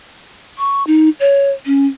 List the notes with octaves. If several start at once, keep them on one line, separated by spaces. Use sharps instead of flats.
C#6
D#4
C#5
C#4